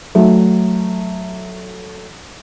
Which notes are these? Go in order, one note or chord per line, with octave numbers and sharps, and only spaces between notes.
F#3 A3